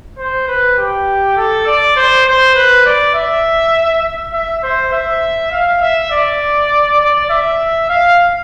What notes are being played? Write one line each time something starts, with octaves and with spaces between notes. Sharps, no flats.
C5
B4
G4
A4
D5
C5
C5
B4
D5
E5
E5
C5
E5
F5
E5
D5
D5
E5
F5